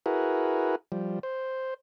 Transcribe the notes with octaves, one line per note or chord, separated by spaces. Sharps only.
E4 F#4 G#4 A#4 B4
F3 G3
C5